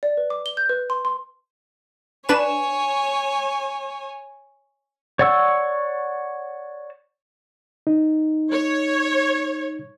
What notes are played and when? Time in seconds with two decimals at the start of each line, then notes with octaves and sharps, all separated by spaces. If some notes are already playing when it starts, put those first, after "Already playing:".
0.03 D5
0.17 B4
0.30 D6
0.46 G7
0.57 G6
0.69 B4
0.90 C6
1.05 C6
2.29 D4 B4 C#5 G#5 E7
5.19 C#5 D5 F#5 C#6 E6
7.87 D#4
8.52 C#5